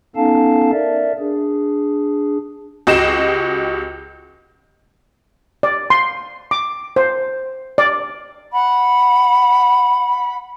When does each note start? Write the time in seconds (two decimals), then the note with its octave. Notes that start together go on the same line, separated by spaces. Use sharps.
0.16 B3 C#4 D#4 A4 F5 A5
0.72 A#4 D5 E5
1.19 D4 G#4
2.87 C#2 F#4 G4 D#5 C7 E7
5.63 D5
5.90 C6
6.51 D6
6.96 C5
7.78 D5
8.52 F#5 B5